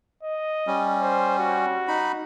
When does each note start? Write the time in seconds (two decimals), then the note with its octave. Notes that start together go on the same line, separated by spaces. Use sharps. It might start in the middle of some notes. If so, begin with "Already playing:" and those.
0.23 D#5
0.67 G3 C#4
1.02 C5
1.39 F#4
1.88 D#4 B5